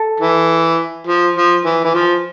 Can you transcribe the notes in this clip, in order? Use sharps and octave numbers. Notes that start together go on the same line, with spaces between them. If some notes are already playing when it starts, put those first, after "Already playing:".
Already playing: A4
E3
F3
F3
E3
E3
F3